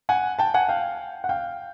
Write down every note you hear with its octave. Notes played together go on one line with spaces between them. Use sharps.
F#5 G#5
G5 A5
F#5 G#5
F5 G5
F#5
F5 G5